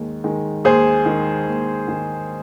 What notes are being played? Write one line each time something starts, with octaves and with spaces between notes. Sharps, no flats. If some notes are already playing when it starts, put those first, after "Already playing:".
Already playing: D#2 D#3 G#3
D#3 G#3
D#2 G#4 C5
D#3 G#3
D#2
D#3 G#3